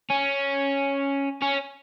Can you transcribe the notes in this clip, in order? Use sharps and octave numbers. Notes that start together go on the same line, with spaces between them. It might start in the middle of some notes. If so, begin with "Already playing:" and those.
C#4
C#4